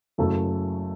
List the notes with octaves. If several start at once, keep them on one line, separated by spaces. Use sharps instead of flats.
F#1 F#2 C#3 F#3 A3